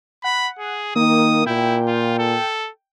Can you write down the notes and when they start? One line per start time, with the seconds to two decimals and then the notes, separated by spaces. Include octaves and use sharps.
0.24 F#5 B5
0.59 G#4
0.96 D#3 A#3 D#6
1.47 A#2 E4 G5
1.88 F4
2.19 A4